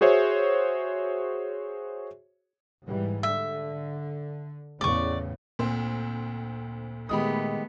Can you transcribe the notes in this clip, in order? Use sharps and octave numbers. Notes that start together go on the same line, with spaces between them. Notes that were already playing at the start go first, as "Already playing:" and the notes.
F#4 G#4 C5 C#5 E5
G#2 E3 G3
D3 E5
E2 A2 C#3 D5 C#6
D2 A#2 A#3 C4 C6
D#3 G#3 A3 B3 G4 B5 D#6